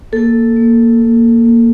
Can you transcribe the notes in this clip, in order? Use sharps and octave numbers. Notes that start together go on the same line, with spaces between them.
A#3 A4
A#3
A#3
A#3